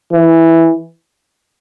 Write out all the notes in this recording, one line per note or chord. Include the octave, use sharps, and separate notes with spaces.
E3